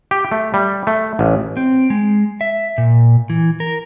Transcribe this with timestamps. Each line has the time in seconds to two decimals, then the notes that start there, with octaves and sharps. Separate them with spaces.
0.11 G4
0.31 A3
0.54 G3
0.87 A3
1.19 A1
1.57 C4
1.90 G#3
2.41 E5
2.78 A#2
3.30 E3
3.60 A#4